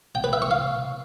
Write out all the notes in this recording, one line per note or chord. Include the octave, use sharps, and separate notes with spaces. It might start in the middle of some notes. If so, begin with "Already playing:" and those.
G5
B4
E5
C#6
F5